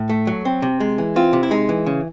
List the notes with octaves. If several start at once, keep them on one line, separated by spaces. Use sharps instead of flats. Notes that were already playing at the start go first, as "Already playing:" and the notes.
Already playing: A2
A3
F#3
C4
C3
G#3
E3
C4 F4
C3
E4
G#3 D#4
E3
C#3